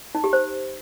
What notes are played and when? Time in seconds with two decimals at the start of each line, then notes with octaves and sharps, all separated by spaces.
0.15 D#4
0.24 G4
0.33 C5